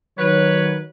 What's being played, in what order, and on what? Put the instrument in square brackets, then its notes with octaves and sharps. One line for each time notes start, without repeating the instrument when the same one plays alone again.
[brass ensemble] D#3 F#3 [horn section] B4 C#5